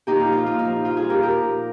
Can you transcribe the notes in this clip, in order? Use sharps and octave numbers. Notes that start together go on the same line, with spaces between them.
A#2 D#4 G4
F4
F3
F4
A#2 F4
D#4
F3
A#2 F4
F4 G#4
F3
G4 A#4
F3 G4 A#4
A#2